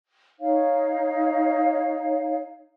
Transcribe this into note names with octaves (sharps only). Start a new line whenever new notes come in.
D#4 C#5 F5